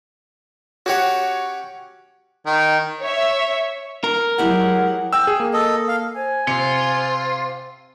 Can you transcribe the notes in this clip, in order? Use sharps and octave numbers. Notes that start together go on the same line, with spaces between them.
C#4 F#4 G4 C#5 F#5
D#3
C#5 E5
A#4
F#3 G#3 E4 G4 G#4 F#5
G5 E6
G#4
A#3
A4 D#5
F5
C5 G#5
C3 F4 C#7